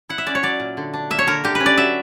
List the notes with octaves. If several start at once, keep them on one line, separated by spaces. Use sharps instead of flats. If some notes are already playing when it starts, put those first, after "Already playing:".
E4 F#5
E5
C#4 D5
C#5
F#3 D5
A#2
D3
D4
A#3 E5
C#5
D3 A#4
D3 G4
B4
C#4
D5
F#3 E5